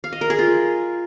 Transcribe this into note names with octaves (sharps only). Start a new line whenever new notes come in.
F5
D#5
A#4
G#4
F4